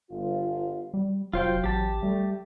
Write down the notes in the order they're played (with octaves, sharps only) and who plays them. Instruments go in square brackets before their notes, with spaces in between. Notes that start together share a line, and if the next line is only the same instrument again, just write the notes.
[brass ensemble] G1 F4
[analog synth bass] G3
[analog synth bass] F1 [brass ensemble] F#3 [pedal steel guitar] F4 C5 G5
[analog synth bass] A1 [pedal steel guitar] G4 A5
[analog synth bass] G3 [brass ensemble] A3